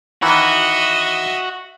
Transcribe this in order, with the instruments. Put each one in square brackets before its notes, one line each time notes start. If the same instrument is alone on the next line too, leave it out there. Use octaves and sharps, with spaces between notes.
[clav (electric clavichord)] D#3 E3 [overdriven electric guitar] F#4 [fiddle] D#5 E5 [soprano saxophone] F#5